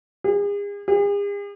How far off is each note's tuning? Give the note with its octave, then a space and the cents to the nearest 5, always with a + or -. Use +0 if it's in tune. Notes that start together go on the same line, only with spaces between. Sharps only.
G#4 -40
G#4 -45